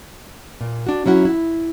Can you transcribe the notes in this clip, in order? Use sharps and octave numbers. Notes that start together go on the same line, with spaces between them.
A#2
D4 F#4
F#3 C#4 E4 F#4
E4